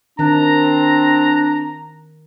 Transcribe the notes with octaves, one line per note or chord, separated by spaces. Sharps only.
D#3 C4 D4 A#5